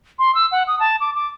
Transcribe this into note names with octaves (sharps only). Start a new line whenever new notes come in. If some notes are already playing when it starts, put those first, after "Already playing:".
C6
E6
F#5
D#6
A5
D6
D6